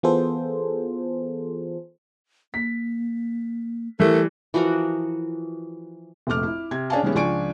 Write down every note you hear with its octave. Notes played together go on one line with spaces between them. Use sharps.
E3 B3 F4 G#4 A4 C5
A#3 B6
E3 G3 A3 A#4
E3 F3 F#4 A#4
F1 A#1 A3 D6 F6
E4
C3 G#6
C#4 D4 G#4 F5 G#5 A5
E3 G3 G#3 B3 C#4 E4
C#2 F3 D4 G#5 C#6 D7